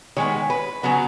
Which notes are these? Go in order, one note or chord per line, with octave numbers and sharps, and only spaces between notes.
D#3 G#3 B3 C#5
B4
C#3 F#3 B3